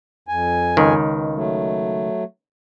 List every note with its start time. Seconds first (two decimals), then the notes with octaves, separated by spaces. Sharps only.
0.28 F2 G#5
0.77 C#2 D#3
1.35 F#3 A3